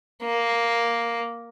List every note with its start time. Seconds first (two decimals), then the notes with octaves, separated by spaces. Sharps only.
0.24 A#3